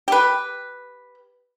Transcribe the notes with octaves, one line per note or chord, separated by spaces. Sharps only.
G4 B4